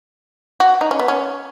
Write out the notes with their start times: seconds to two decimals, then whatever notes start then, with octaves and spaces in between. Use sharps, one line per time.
0.60 F#4
0.81 D#4
0.91 C#4
0.99 B3
1.08 C#4